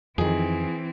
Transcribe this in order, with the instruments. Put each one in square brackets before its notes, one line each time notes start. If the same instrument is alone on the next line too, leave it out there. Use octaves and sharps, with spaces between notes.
[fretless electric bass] F2 D#3 [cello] E3 C4 [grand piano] G#4